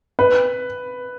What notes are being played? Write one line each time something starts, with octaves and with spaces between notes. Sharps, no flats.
B4